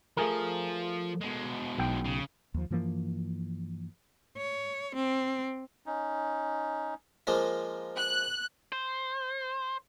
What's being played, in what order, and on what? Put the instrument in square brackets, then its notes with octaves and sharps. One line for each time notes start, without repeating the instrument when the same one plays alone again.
[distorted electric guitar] F3 [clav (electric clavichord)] A3 G#4 A#4
[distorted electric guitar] B2 G#3
[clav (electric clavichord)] B1 G5
[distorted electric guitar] C#3
[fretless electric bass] D#2 F3
G2 E3 F3 A#3
[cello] C#5
C4
[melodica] C#4 D#4
[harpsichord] F3 G#3 A#3
[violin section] F#6
[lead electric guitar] C5